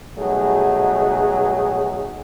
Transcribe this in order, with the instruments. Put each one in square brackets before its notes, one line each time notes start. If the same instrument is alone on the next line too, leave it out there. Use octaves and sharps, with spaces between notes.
[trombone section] B2 F#3 G3 A3 D#4 G#4